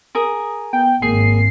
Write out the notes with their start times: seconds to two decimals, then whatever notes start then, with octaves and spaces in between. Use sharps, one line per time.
0.15 G#4 A#4 D#6
0.73 B3 G5
1.02 G#1 A#3 G#4 C7